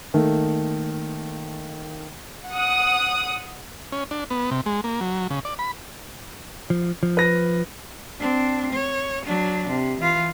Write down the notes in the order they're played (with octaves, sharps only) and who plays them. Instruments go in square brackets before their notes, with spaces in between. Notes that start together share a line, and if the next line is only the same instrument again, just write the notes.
[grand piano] D#3 A3 A#3
[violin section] F#5 D#6
[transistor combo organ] C#4
D4
B3
C3
G#3
A#3
F#3
C#3
D5
B5
[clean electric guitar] F3
F3
[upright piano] B4 A#6
[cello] C4 D4
C#5
F#3 D4
C3
E3 F4